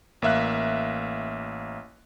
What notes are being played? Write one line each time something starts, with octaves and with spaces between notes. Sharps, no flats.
A1 A#3 E5 F5 F#6